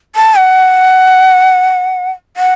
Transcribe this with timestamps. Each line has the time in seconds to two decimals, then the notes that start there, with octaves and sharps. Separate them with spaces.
0.16 A5
0.38 F#5
2.37 F#5